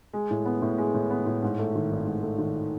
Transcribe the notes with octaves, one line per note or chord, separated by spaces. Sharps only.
G#3
A2
B3
A2
G#3
A2
B3
A2
G#2
A3
D#3
G#1
G#2
A3
D#3